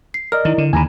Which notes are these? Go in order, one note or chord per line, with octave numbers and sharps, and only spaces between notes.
C7
A#4 D5 D#5 F6
D#3 E4
D3
D#2 D3 G#5 A#5 B5